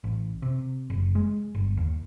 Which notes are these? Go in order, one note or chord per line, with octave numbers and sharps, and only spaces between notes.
A1
C3
F#1
G#3
G1
D#2